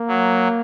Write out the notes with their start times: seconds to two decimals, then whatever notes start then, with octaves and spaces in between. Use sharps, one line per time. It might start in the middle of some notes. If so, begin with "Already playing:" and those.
Already playing: A#3
0.08 F#3